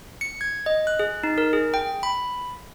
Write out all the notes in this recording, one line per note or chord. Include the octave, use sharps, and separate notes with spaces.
C#7
G#6
D#5
F#6
G#4
D#4
A#4
G#4
G5
B5